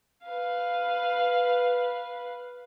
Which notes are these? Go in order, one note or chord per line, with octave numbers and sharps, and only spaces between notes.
B4 F5